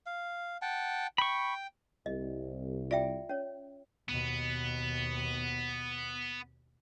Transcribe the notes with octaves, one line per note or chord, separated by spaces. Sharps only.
F5
F#5 G5 A5
G5 B5 C#6
C2 D#5
F4 D5 E5 G5
C#4 C#5
D#2 B2 B3